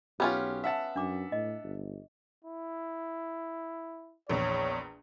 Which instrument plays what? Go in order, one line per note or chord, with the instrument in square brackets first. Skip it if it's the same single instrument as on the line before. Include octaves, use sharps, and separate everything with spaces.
[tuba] B1 [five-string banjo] B3 C#4 F4 [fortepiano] G4
[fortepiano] E5 F#5 A5
[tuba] F#2 [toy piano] D4 D6
[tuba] A2 [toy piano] D#5
[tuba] G1
[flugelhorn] E4
[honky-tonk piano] A#1 E2 [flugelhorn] C#5